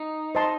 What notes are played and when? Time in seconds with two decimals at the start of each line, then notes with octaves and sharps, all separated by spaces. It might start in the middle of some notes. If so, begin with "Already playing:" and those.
Already playing: D#4
0.35 C5 D#5 A5 C6